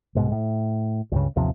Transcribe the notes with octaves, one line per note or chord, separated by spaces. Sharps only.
C2 G#2 B2
A2
C#2 G2 C#3
A1 D#2 C3 F3